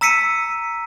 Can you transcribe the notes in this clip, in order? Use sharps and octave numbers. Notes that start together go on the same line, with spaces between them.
A#5 E6 B6 C#7 D#7